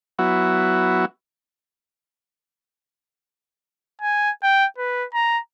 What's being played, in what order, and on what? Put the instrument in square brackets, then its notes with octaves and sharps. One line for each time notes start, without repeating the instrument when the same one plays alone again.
[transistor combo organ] F#3 B3 E4 F#4
[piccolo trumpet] G#5
G5
B4
A#5